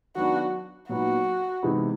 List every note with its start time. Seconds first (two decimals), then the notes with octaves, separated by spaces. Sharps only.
0.16 D#3 F#3 B3 D4 F#4
0.89 A#2 F#3 B3 D#4 F#4
1.63 C3 E3 G#3 B3 D#4